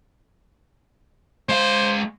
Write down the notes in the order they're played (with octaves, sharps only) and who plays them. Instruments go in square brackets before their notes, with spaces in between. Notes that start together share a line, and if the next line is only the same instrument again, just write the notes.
[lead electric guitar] G#3 F5 [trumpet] C5